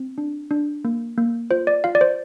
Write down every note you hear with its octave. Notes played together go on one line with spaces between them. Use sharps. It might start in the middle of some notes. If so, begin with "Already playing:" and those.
Already playing: C4
D4
D4
A#3
A#3
F4 C5
D5
F4 F5
D5
C5